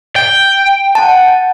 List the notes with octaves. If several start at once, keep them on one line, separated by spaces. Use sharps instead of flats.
G5
F#5 A5